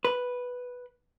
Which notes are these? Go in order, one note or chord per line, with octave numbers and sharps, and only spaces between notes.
B4